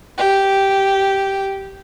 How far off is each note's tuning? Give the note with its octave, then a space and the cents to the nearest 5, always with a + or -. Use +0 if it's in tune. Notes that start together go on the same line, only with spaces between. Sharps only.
G4 -5